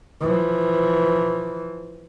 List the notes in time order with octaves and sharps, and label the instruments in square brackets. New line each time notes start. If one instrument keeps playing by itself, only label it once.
[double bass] E3 F3